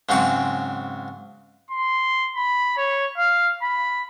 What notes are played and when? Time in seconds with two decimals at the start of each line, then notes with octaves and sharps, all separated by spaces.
0.09 G#2 C#3 F#3 C4 C#6
1.70 C6
2.36 B5
2.77 C#5
3.18 F5
3.62 B5